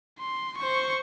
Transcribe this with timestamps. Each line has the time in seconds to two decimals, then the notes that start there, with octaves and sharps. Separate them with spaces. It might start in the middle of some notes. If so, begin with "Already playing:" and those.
0.20 C6
0.57 C5 C#6